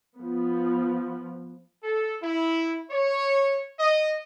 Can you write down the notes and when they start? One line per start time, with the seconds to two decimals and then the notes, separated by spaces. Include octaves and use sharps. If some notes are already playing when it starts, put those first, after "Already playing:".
0.18 F3 B3
1.83 A4
2.22 E4
2.90 C#5
3.79 D#5